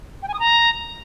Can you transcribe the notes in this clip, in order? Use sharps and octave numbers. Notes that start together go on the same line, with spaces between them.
G5
G#5
D#6
A#5